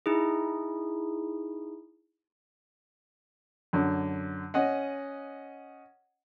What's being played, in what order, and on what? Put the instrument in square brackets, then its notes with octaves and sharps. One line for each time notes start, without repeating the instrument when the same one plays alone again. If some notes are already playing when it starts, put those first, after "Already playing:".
[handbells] D#4 E4 G#4
[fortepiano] F#2 D3
C#4 D#5 F#5